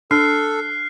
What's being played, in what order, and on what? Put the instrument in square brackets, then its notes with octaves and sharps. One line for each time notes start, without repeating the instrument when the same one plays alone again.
[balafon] D4 [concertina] A4 [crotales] F6 F#6 C7